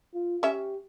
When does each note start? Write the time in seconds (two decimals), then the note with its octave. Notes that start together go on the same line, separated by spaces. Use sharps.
0.14 F4
0.43 C#4 G4 E5